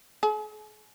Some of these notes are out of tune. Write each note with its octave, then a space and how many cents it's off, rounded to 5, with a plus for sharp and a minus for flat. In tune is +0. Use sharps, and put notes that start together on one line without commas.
G#4 +45